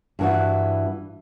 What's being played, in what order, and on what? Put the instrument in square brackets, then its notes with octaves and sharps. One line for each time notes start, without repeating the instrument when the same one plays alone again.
[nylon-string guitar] G2 E3 F#4